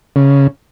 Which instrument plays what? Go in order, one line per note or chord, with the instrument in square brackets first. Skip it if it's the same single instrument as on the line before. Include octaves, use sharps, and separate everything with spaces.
[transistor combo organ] C#3